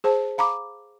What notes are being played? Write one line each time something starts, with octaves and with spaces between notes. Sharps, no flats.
G#4 C5 A5
F5 A#5 B5 D6